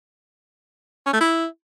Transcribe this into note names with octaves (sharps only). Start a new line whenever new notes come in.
C#4
A3
E4